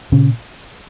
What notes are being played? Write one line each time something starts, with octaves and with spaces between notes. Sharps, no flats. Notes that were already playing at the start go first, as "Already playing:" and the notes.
A#2 C#3 C#4